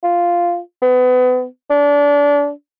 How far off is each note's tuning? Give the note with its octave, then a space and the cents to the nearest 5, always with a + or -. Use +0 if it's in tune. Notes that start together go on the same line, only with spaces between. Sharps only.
F4 -5
B3 +30
D4 -25